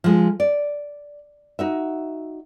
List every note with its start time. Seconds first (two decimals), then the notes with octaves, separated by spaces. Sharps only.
0.04 F3 G#3
0.40 D5
1.59 D#4 F#4 E5